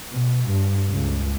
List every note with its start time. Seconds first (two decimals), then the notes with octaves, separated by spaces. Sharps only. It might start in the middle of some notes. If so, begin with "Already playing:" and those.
0.12 B2
0.51 G2
0.90 C#2